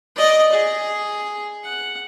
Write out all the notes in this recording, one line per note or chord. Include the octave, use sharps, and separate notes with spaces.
D5 D#5
G#4
F#5